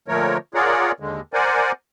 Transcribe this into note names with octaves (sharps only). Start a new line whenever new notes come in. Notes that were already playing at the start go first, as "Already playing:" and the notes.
A#2 D3 F3 A3 A#4 C#5
F4 G#4 A#4 C#5 D5 F#5
D#2 D3 G#3
A#4 C5 D5 F#5 G#5